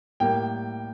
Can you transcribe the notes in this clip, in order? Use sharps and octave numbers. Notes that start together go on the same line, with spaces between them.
A2 G3 A#3 G5